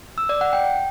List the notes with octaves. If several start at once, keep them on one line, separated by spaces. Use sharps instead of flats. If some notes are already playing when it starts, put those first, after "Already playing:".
E6
D5
F#5
G5